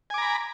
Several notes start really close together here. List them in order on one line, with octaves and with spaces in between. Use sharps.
G#5 D6 A#5 B5